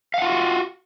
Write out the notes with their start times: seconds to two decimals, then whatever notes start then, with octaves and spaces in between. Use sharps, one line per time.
0.14 F5
0.18 F#5
0.22 F4
0.26 F#4